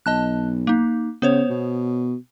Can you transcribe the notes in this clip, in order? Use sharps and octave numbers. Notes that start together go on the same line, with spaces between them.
B1 D#5 A5 F#6
A#3 D#4
C#3 B3 C5 C#5
B2